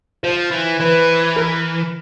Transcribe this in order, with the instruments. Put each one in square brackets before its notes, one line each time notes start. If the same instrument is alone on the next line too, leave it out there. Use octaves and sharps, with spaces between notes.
[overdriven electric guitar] F3 [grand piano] C5
[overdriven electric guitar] E3
[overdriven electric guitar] E3 [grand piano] B4
[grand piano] A#4